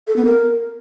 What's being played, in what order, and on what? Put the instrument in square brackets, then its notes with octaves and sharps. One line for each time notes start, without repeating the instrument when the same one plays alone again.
[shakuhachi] A4
B3
A#4